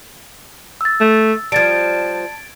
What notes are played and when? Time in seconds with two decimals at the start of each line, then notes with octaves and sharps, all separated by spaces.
0.81 E6 A6
1.01 A3
1.52 F3 G3 A5 G#6 A6 D7